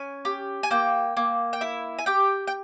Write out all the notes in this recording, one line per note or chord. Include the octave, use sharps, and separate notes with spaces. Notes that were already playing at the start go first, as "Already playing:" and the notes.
Already playing: C#4 G#5
G4
G#5
A#3 G5
A#3
G5
E4 E5
G#5
G4 G5
G5